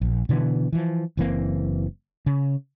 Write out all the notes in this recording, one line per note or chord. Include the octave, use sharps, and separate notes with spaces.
A#1
B2 D3 E3 B3
E3 F3
F#1 E3 A#3 C4
C#3